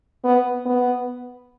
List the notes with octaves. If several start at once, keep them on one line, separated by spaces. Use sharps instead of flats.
B3
B3